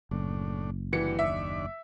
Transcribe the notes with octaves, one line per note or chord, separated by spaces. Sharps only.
F#1 A2 D4
D3 E3 F#3 G3 C#7
D#2 D4 D5 E5